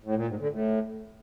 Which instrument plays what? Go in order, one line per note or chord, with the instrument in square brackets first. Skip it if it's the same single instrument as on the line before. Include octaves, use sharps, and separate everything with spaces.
[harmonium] A2
A#2
G#2
D3
A2